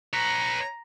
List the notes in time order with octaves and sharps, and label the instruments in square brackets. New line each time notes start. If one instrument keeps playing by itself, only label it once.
[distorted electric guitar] B4 C#5 [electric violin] A#5